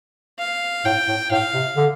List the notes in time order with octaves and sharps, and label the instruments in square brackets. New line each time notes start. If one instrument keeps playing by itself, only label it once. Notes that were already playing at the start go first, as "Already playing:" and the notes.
[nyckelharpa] F5
[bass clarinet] A2 [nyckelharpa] G5
[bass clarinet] A2
[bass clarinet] A2 [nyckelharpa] F5
[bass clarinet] C3
D3